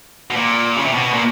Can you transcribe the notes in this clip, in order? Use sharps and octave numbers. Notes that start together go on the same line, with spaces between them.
B2
A#2
C#3
C3
B2
A#2